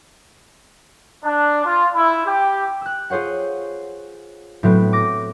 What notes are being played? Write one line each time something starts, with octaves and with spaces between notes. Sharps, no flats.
D4
F4
E4
G4
E6 F#6
F4 G#4 C5 C#5 F#5
A2 F#3 B3 C4
D6 A#6